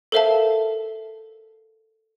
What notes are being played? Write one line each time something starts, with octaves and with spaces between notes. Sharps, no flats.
A4 A#4 C5 E5 F5 A5